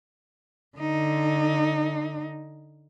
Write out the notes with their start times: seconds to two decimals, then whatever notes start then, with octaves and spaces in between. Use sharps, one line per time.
0.78 D3 D#4